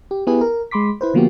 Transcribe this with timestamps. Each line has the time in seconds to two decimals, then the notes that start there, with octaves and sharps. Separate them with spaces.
0.11 G4
0.27 B3 E4 G4 G#4 B4
0.41 A#4
0.71 G#3 B5 C6 D6 B6
1.01 E4 B4 C5
1.14 D3 F3 A#3 B3 F#4 G4